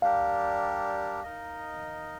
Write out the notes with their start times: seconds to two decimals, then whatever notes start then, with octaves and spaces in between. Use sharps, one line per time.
0.02 G3 D4 G4 A#4 F5
1.23 D#4 A#4 D#5